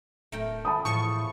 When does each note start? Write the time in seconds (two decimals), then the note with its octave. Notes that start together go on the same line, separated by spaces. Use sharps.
0.32 D1 A3 A#4 G5
0.65 A5 B5 D#6
0.85 E2 A2 F3 C#6